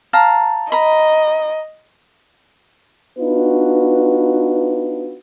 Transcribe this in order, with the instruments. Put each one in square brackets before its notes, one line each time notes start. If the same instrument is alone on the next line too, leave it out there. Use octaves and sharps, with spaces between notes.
[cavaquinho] F5 A5 A#5
[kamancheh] D#5 [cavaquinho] A#5 B5
[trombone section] B3 D4 D#4 F4 F#4 B4